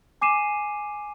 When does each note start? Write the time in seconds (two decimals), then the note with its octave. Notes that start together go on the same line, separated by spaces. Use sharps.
0.21 G#5 D6 C7 D#7 E7